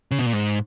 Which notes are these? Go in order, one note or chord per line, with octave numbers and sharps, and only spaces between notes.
C#3
B2
A#2
G#2